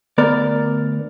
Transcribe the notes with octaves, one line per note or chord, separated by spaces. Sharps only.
D2 B3 A#4 D5